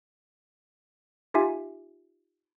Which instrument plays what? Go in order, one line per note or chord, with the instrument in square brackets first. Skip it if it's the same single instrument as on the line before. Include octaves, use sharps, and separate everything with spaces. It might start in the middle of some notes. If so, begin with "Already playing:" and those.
[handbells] D#4 F4 G4 E5 G#5